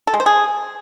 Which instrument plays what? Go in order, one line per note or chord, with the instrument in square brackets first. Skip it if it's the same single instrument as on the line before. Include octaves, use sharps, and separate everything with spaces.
[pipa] A4
G#3
C5
G#4